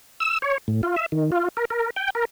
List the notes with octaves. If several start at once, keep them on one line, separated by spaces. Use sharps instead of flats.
E6
C#5
A2
F4
E5
D#3
F4
A#4
A#4
G5
A#4